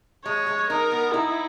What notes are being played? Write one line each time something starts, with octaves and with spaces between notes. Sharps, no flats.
G#3 C#5
G#3
D#4 A#4
B3
D#4 E4